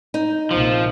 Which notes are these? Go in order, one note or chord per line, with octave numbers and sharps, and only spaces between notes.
D#4
A#1 C3 F3